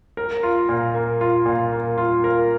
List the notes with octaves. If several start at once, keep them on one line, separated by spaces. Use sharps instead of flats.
A#4
F4
A#2
A#3
F4
A#2
A#3
F4
A#4